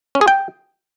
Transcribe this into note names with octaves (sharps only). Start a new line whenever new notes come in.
C#4
G#4
G5